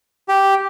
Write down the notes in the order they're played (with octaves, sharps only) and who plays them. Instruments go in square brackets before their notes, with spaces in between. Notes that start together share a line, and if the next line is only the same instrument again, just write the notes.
[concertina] G4